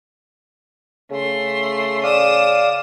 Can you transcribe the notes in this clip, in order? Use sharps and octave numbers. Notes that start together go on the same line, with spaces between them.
C#3 A3 C6
D5 F5 D#6 E7